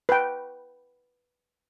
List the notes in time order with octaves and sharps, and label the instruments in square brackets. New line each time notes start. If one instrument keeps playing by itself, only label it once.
[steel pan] B4 G5